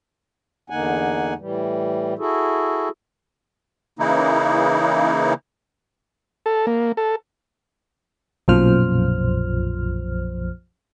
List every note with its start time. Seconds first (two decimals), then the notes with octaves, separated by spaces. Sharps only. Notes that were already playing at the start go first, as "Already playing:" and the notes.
0.70 E2 D3 A#3 D#4 F#5 G#5
1.38 A2 E3 G3
2.19 E4 F#4 G#4 A4
3.99 C#3 E3 A#3 D#4 E4
6.46 A4
6.67 A#3
6.97 A4
8.48 B1 F#2 A#2 F3 C5 F6